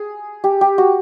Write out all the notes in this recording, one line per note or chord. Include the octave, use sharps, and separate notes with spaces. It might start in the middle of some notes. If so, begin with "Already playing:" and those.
Already playing: G#4
G4
G4
F#4